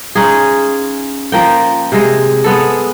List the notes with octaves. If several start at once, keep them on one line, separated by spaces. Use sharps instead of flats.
C#4 D#4 F4 G#4
F3 A#3 G5
C3 G#3
G#3 B3 A4